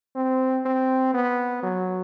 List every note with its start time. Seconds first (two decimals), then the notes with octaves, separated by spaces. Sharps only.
0.16 C4
0.66 C4
1.14 B3
1.63 F#3